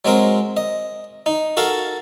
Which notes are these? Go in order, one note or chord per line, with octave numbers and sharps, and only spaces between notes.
F#3 G#3 C4 A#4
D#5
D#4
F#4 A4 A#4 F5 A5